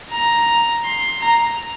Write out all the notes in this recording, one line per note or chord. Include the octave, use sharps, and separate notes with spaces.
A#5
C6
A#5